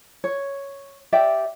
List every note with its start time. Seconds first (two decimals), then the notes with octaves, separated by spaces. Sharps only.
0.24 C#5
1.12 G4 D5 E5 G5